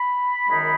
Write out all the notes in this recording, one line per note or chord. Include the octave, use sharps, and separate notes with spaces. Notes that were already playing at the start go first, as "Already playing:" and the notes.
Already playing: B5
F#2 D#3 G#3 D#4